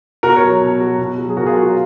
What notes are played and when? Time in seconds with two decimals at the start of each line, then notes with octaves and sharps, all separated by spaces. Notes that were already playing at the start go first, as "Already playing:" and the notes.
0.23 B2 F#4 A#4
0.36 A#4 C#5
0.42 F#3
0.61 B2
0.80 F#3
0.98 B2
1.18 F#3
1.29 G#4
1.37 B2 F#4 A#4
1.47 F4 G#4
1.56 F#3 F#4
1.65 F4